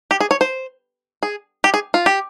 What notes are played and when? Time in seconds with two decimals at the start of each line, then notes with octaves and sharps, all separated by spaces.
0.11 G4
0.21 G#4
0.31 C#5
0.41 C5
1.23 G#4
1.64 G4
1.74 G#4
1.94 F4
2.06 G4